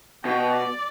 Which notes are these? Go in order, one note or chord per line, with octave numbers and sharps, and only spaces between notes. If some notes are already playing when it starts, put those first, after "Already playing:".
B2 G5
D5